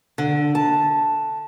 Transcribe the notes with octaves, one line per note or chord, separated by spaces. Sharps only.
D3
A5